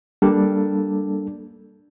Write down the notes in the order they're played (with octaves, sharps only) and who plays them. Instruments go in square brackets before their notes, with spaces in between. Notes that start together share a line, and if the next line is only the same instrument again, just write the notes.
[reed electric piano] G3 A#3 D4 A4